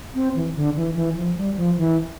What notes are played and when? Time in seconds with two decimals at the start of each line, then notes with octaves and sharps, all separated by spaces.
0.15 C4
0.35 E3
0.56 D3
0.76 E3
0.96 E3
1.17 F3
1.37 G3
1.57 F3
1.78 E3